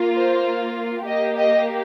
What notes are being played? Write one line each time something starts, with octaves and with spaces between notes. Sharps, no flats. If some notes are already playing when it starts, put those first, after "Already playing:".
Already playing: A#3 F4
C5
A#3 G4 D#5
D#5